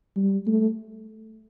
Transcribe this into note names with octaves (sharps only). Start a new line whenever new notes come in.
G3
A3